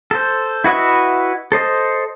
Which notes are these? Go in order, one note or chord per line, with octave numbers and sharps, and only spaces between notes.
A4 C5
E4 F#4 B4 D#5 E5
A4 C5 D#5